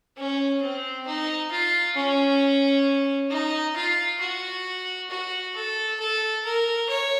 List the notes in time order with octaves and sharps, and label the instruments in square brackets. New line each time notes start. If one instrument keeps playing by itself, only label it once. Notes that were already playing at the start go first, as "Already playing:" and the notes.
[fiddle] C#4
C4
D#4
F4
C#4
D#4
F4
F#4
F#4
A4
A4
A#4
C#5